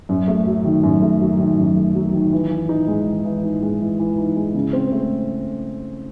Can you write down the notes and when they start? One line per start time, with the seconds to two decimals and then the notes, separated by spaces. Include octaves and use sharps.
0.09 F#2
0.28 A3
0.47 F#3
0.65 D#3
0.83 F#2
1.02 A3
1.21 F#3
1.40 D#3
1.58 F#2
1.76 A3
1.95 F#3
2.14 D#3
2.33 E3
2.51 E3
2.69 D#4
2.88 G#3
3.07 E3
3.25 E3
3.44 D#4
3.62 G#3
3.81 E3
3.99 E3
4.18 D#4
4.36 G#3
4.54 C#3
4.73 C4
4.92 A3